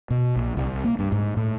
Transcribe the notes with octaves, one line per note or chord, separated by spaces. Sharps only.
B2
A#1
C2
A#3
G2
G#2
A2